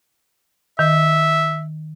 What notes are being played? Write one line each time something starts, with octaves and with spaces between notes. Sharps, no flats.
D#3 E5